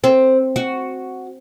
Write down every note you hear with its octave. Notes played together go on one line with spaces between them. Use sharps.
C4
F#4